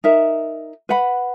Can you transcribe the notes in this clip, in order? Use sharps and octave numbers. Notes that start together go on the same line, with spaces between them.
D#4 A#4 E5
B4 F#5 B5